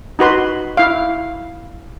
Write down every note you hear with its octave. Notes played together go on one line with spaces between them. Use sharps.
D#4 F#4 B4 C6
E4 F5